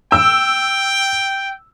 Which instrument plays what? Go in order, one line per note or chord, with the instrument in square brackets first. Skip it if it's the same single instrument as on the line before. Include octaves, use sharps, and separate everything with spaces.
[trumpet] G5 [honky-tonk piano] E6